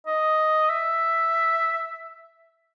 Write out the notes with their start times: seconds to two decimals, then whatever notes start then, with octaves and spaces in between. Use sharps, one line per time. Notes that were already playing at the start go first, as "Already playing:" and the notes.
0.07 D#5
0.70 E5